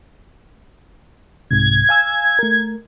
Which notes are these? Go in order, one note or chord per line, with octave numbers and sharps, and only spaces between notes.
C2 G#2 C3 G#6
F5 G#5 E6
A3 A#4